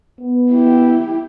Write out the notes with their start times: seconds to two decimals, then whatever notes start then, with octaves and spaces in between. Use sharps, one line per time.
0.20 B3
0.51 E4 G4